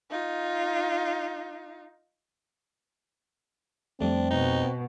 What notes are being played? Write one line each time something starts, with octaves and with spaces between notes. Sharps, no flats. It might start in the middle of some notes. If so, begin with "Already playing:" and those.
D#4 F4
F2 G3 A3 C4 D4
B2 D#4